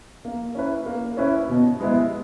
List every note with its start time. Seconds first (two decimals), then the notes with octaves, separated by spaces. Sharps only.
0.25 A#3
0.55 C#4 E4 B4
0.86 A#3
1.17 C#4 E4 B4
1.49 B2
1.80 G#3 B3 E4 B4